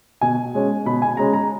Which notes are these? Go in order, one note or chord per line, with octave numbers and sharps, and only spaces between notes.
B2 G#5
G#3 C#4
B2 B5
G#5
G#3 C#4 A#5
A#5